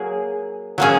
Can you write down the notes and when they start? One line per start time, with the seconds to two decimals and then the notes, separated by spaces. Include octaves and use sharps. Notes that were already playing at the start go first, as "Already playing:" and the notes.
Already playing: F#3 A#3 G#4
0.78 F#3 A#3 C#4 G#4